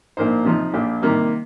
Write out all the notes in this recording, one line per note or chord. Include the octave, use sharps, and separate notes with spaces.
A#1 A#2 A#3 D#4 C5
C3 F3 D#4
A#1 A#2 A#3 G4
C3 D#3 G3 A#3